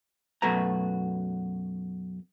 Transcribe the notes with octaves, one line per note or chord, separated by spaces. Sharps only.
F#2 B2 A3 F#4 B4 A#5